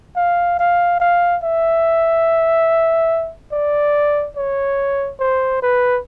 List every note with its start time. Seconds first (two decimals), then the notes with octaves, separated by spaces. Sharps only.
0.16 F5
0.59 F5
1.00 F5
1.43 E5
3.52 D5
4.36 C#5
5.20 C5
5.62 B4